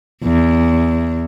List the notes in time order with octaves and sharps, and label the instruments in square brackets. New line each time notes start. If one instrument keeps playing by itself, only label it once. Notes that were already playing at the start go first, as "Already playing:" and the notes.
[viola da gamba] E2